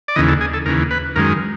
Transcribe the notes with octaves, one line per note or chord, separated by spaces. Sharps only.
D5
D#2 C#3 E3 D#5
A4
G#4
A4
D#2 C#3 E3 A#4
B4
F#2 D#3 G#3 A#4